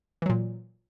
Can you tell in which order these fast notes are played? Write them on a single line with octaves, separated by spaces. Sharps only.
E3 F#3 A#2